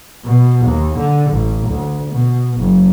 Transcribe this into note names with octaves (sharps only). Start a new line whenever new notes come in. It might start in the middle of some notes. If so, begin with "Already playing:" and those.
B2
D#2
D3
A1
D2
B2
F#1